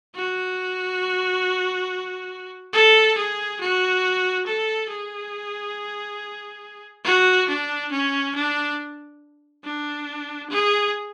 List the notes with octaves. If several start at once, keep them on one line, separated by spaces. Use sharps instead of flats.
F#4
A4
G#4
F#4
A4
G#4
F#4
D4
C#4
D4
D4
G#4